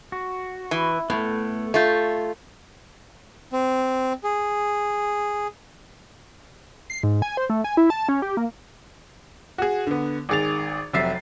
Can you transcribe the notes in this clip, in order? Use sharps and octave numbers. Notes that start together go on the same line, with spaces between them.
F#4
E3
A2 A3 B3
A3 F4 C#5 G6
C4
G#4
C7
G#2
G#5
C5
A3
G#5
E4
A5
C#4
G4
A#3
F#4 G#4
D3 B3
G#1 D#3 G#4 A6 F7
F1 C3 F#3 E5 A6 C7